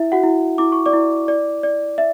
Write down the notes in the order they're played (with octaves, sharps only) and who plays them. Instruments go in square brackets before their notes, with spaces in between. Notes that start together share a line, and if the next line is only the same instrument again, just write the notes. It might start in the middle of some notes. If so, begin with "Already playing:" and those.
Already playing: [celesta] E4 E5
F#4 F#5
E4
E4 D6
C#6
D5 D6
E4
D5
D5
E5